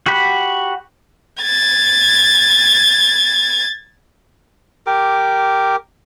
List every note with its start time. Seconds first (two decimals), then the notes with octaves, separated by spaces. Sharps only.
0.06 F#4 G4 F#5 B5
1.42 G#6 A6
4.86 G4 A#4 D6